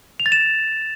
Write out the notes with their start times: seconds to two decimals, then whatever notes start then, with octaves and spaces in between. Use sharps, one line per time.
0.20 F7
0.26 A6
0.32 E7